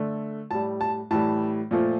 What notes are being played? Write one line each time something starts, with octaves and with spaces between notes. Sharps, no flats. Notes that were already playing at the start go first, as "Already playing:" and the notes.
Already playing: D3 A3
A2 G3 A5
A5
A2 E3 G3 A5
A#2 F3 A3